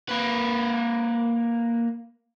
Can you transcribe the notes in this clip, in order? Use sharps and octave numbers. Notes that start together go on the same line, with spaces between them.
A#3 B4